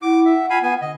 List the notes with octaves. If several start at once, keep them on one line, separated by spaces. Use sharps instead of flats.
E4 F#5 D6
E5
F4 F5 G#5 B5
B3 G#5
D3 D#5